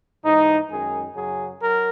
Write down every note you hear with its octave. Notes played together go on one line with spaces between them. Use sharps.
G#2 E3 G#3 D#4
F#2 D#3 G#3 G#4
F#2 C#3 F#3 G#4
F#3 A#4